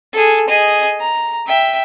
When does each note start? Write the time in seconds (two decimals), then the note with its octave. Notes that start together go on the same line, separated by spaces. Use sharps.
0.13 G#4 A4
0.48 G#4 D#5
1.00 A#5
1.46 E5 G5